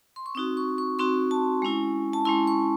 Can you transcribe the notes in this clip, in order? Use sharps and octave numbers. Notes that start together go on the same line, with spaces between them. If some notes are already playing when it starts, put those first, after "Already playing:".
C6
C#6
C4 D#4 F#4 D#6
C#6
C#6
C4 D#4 F#4 C6
A5
G#3 C#4 E4
A5
G#3 C#4 E4 C6
C#6